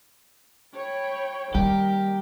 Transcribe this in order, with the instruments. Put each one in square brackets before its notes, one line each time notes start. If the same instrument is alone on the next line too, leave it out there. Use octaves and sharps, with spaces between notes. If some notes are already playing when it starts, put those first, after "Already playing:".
[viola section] C#5 G5 B5
[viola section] D#3 A#4 [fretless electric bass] G3 [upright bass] A#3 [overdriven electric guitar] G4